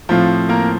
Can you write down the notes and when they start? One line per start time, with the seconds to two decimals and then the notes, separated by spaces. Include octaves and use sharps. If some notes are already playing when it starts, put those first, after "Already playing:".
0.09 A2 F3 C4 F4
0.49 A#3 A#4